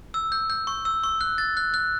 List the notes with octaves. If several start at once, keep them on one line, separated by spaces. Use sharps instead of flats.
E6
G6
G6
C#6
E6
C#6
F#6
A6
F#6
F#6